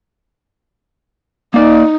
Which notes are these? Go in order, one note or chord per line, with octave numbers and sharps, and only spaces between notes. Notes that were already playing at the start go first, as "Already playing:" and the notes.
A#3 D#4 D5